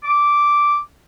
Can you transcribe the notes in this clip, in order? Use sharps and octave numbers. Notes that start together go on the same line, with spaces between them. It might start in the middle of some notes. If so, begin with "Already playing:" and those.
D6